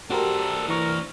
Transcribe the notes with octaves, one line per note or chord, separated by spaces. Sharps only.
D4 F#4 G4 A4 A#4 C5
E3 A#4 C#6 F6